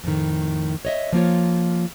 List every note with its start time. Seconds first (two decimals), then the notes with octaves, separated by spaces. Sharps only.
0.04 F2 A2 D#3
0.85 C#5 D#5 E5
1.13 F3 A#3 F4 C#5